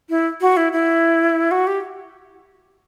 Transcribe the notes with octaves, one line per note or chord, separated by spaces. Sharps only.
E4
F#4
E4
E4
F#4
G4